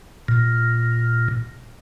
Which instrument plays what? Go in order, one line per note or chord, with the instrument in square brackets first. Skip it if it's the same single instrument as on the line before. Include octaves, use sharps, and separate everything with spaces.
[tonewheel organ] A#2